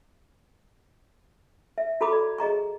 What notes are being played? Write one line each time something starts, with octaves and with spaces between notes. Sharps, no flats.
E5
F#4 A4 A#5 B5 D6 D#6
D5
G#4 D#5 A#5 C#6